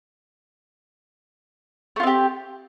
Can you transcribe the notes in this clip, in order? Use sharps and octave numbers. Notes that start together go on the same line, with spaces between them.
A3 C4 F4 G4